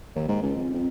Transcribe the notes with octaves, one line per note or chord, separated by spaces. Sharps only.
D#2
G#2
C#2
F2
F2